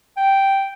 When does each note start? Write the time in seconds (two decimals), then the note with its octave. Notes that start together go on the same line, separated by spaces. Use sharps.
0.17 G5